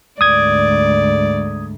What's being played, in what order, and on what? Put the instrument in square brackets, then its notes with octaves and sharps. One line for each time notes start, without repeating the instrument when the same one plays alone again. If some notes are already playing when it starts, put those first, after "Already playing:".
[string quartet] D2 G#2 [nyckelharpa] D5 [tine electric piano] D#6 G#6